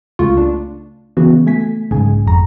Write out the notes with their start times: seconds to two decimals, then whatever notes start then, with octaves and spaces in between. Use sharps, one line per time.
0.19 C#2 C#3 A3 F4 C#6
0.37 D4
1.17 C#3 E3 B3 F#4
1.46 A3 G#5 B6
1.91 B1 G#2 C#3 G#4 G#5
2.26 G1 F2 A#5